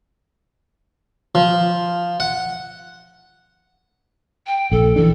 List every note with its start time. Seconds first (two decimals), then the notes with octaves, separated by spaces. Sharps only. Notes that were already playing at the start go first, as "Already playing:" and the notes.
1.35 F3
2.20 F#5
4.47 G5
4.72 A#1 A4
4.96 E3 D4 A4